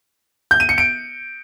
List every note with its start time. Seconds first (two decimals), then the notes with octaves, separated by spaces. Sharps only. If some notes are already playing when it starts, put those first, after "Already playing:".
0.51 G6
0.60 D#7
0.69 C#7
0.78 D7